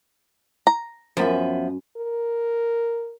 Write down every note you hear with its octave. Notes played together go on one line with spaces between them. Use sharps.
A#5
F#2 F3 B3 E5
A#4